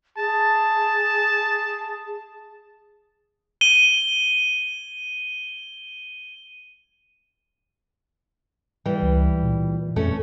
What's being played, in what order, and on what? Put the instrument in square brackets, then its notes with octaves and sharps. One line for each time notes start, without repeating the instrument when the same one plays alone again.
[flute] G#4 [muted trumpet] A5
[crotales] D#7 G7
[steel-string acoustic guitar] E3 G3
[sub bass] C#2
A#2
[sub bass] F2 [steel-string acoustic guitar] A3 C#4